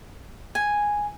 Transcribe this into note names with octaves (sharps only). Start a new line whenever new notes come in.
G#5